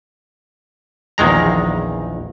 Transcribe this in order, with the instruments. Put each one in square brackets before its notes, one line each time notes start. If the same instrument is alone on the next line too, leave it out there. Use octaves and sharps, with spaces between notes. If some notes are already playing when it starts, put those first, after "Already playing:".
[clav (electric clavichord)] A#1 E2 D#3 G#3 A#5